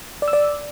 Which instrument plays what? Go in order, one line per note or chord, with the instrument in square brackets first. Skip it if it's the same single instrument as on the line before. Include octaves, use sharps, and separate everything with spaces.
[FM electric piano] D5
E6
D5